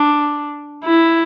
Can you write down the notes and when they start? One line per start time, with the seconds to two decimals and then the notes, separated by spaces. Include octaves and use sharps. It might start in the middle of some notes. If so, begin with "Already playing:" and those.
Already playing: D4
0.84 E4